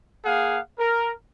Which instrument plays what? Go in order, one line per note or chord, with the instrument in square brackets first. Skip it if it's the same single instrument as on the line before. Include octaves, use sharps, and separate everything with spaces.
[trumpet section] A#3 G#4 F5 F#5
A#4